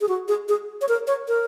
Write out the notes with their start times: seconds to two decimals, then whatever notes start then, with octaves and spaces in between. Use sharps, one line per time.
0.01 G#4
0.09 F#4
0.28 G#4
0.49 G#4
0.81 C#5
0.89 A#4
1.07 C#5
1.28 A#4